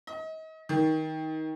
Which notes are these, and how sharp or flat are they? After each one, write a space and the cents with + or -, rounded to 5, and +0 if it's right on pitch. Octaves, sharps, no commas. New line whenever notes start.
D#5 +35
D#3 +20